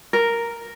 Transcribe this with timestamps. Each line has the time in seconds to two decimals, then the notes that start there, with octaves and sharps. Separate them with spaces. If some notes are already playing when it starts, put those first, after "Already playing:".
0.13 A#4